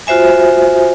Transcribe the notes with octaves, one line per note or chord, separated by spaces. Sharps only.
F4 F#4 C5 E5 G#5